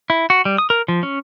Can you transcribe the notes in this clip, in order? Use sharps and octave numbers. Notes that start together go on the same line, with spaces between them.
E4
F#4
G3
D#6
A#4
F3
C#4